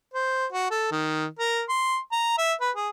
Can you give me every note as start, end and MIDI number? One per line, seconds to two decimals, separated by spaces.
0.14 0.46 72
0.52 0.67 66
0.70 0.89 69
0.91 1.25 51
1.39 1.62 70
1.69 1.98 84
2.12 2.33 82
2.38 2.53 76
2.61 2.71 71
2.76 2.89 68